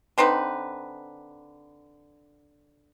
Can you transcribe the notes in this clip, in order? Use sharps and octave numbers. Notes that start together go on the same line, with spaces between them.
D3 C4 D#4 B4